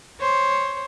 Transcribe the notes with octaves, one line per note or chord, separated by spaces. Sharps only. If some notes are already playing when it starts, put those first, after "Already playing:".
C5 C#5